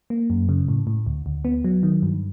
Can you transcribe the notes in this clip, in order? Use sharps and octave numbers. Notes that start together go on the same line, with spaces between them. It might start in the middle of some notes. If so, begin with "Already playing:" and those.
A#3
F#2
C#3
A2
A2
D2
D2
B3
F#3
D#3
G2